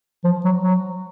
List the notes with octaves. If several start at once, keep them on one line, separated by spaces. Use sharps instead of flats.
F3
F#3
F#3